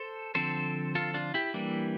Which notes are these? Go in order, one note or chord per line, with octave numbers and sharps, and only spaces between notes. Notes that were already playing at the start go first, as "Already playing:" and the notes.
Already playing: A4 C5
D3 F3 C4 A4 C5
F4 A4
D4 F4
E4 G4
E3 G3 A#3 D4